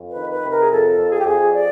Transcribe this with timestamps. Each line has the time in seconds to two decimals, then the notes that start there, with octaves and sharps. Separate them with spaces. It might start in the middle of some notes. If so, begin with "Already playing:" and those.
Already playing: F2
0.09 B4
0.16 D#3
0.30 B4
0.44 C3
0.50 A#4
0.61 G#4
0.71 F2 A4
0.98 F2
1.12 G#4
1.19 G4
1.26 F2 G#4
1.53 D5